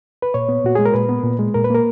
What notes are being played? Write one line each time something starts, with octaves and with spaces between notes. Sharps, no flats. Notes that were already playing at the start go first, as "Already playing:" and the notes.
B4
A#2 C#5
B3
A#2 F#4
G#3 G#4
A#4
A#2 B4
B3
A#2
G#3
A#2 A#4
B4
A#3 A#4